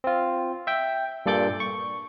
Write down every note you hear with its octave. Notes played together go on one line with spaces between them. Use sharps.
C4 F4
E5 G5
G2 A#2 A4 D5 D6 G6
C#6